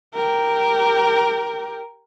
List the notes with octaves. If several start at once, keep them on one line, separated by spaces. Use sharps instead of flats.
G4 A#4